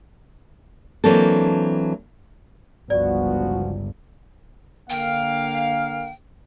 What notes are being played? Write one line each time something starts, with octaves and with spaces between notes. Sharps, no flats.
E3 F#3 A#3 C4 D4 A4
G1 C#2 F3 B3 F#4 D5
D3 A#3 F5 G5